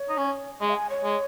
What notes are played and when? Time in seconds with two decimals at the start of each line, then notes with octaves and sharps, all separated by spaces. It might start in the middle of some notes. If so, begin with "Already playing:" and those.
Already playing: C#5
0.09 D#4
0.17 C#4
0.60 G#3 D#5
0.70 F5
0.74 G#5
0.90 C#5
1.04 G#3